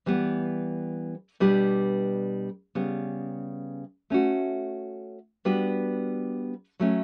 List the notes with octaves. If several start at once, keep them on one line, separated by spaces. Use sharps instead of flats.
E3 G3 B3
B2 G3 D4 G4 B4
C#3 G3 B3
A3 C#4 F#4
G3 B3 D4 F#4 B4
F#3 A3 C#4